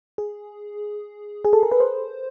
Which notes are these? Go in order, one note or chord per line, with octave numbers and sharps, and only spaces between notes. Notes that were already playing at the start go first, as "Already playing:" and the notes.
G#4
G#4
A4
A#4
B4
C5